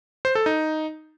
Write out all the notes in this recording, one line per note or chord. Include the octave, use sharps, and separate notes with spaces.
C5
A4
D#4